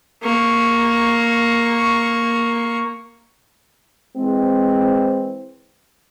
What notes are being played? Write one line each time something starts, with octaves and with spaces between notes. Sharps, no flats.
A#3 C#6
E3 G#3 C4